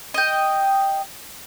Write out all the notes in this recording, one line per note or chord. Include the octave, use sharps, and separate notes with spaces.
D#5 G5